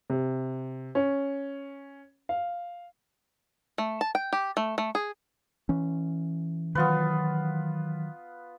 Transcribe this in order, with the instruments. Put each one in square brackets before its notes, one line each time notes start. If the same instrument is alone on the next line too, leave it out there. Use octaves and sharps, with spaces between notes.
[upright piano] C3
C#4
F5
[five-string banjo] A3
A5
G5
G4
A3
A3
G#4
[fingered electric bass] E3 C#4
[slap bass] D#3 F#3 [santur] B3 F4 B4